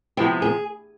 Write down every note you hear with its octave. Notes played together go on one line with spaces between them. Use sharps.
C3 F3 G#3 B3 E4 G4
G#4